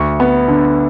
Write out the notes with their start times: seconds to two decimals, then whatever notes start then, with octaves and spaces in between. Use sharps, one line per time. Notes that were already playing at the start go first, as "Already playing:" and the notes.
Already playing: D2 C#6
0.20 B3
0.48 D3